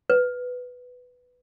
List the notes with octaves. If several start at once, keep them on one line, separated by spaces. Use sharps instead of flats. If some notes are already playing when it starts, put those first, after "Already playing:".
B4